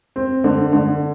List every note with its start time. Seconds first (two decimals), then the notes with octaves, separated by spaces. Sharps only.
0.16 C4
0.44 D3
0.73 D3